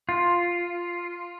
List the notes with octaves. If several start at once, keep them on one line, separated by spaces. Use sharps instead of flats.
F4